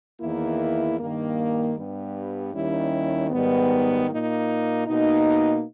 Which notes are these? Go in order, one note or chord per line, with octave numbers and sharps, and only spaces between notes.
E2 D#3 A#3 E4
G2 D#3 A#3
G2 G3 B3
D#2 D#3 G3 C#4 E4
G#2 D#3 G3 B3
A#2 A#3 D#4
B2 A#3 D#4